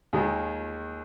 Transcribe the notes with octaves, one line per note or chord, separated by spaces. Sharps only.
D#2 D#3 G#3